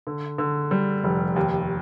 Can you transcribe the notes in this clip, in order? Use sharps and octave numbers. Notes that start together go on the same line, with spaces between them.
D3
D3
G3
F1
D#2